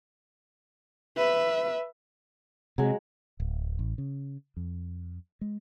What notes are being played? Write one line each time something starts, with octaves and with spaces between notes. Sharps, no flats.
B4 E5
C3 F#3 G#3
D1
A1
C#3
F2
G#3